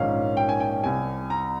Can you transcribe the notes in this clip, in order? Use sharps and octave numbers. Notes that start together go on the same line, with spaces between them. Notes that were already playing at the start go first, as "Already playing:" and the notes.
Already playing: A#1 G#2 D#3 A#3 C#4 F5
G5
G#5
G5
C2 C3 G3 G#5
A#5